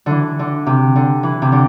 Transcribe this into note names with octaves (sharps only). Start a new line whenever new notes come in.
D3 E3
D3
C3
D3
E3
C3
D3